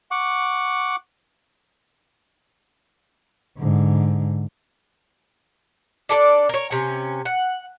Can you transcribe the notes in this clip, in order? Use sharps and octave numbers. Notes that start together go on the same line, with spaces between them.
F#5 C#6 D6
G#2 D3
D4 A4 A#4 D5
A#4 C#5
C3 C#4
F#5